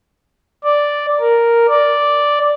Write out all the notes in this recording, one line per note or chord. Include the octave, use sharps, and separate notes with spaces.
D5
A#4
D5